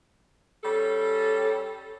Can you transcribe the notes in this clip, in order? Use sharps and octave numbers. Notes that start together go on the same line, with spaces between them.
G3 C#4 A4